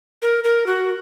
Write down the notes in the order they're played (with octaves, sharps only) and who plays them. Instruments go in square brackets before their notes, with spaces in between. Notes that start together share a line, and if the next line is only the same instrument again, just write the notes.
[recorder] A#4
A#4
F#4